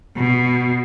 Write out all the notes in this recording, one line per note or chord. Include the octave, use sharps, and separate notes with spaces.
B2